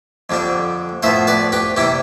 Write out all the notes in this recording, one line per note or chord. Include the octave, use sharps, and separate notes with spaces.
F2 D3 G3 D4
A2 F3 B3 C5 E5
B4 D5
G4 B4
C3 E3 G3 E4 G4